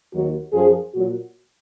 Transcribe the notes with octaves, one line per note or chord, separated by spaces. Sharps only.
D#2 D#3 F#3 F#4
F#2 F3 G#4
A#2 F#3 F#4